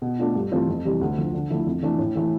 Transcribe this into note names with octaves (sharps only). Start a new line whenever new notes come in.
B2
A3 D4 F4
G2
E3 A3 C4 F4
F2
C3 E3 G3
D2
D3 F3
D3
F3 A3 E4
F2
E3 A3 D4 A4
A2
E3 A3 E4 A4